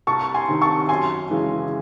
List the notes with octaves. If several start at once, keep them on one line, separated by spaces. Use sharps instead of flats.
C2 A5 C#6
G#5 C6
C3 D#3
A5 C#6
F#2 G#5 C6
C#3 E3 G#3